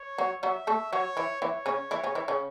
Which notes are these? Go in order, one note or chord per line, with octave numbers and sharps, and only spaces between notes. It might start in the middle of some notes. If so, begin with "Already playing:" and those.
Already playing: C#5
F#3 F#4
F#3 F#4 E5
A3 A4
F#3 F#4 C#5
E3 E4
E3 E4 C#5
C#3 C#4
E3 E4
C#3 C#4
E3 E4
C#3 C#4